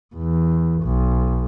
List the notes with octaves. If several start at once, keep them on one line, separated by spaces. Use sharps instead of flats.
E2
B1